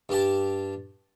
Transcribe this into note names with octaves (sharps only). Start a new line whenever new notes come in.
G2 G4 A5